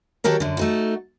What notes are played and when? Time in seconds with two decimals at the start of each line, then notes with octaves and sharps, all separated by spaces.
0.24 D#3 F#3 G4 A4 A#4 C#5
0.40 F#2 D3
0.57 A3 D#4 F#4